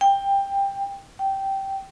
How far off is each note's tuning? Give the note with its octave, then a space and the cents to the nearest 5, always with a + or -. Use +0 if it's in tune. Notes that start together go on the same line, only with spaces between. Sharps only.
G5 +15
G5 -10